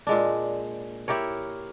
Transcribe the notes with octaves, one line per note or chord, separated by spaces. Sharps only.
A#2 G#3 D4
E4 G4 A#4 C#5